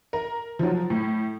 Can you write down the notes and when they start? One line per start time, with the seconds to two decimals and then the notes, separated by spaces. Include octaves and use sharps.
0.13 A#4
0.59 F3 F#3
0.90 A2